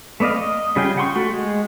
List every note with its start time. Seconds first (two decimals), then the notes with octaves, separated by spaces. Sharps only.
0.20 A3 B3 D5 D#5 F5
0.37 D#5
0.76 C#3 G3 F4 G#4 G5
0.97 F#5 G5 C6 C#6
1.16 A3 F#4
1.34 G#3